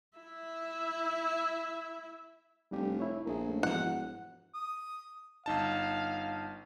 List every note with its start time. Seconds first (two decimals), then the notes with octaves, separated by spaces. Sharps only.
0.18 E4 E5
2.71 F1 G3 D4 G4
3.00 E4 C#5
3.26 A#1 G#4 A#4
3.48 A3 C#4
3.63 E1 G#2 E3 F3 F#5
4.54 D#6
5.46 G1 D#4 F5 A5